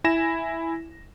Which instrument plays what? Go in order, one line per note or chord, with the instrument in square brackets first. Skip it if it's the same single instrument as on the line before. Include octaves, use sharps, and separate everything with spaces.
[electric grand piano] E4 G#5 A#6 E7